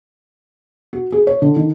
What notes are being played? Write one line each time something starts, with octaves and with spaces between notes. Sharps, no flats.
F#4
G#4
C#5
D3
D#3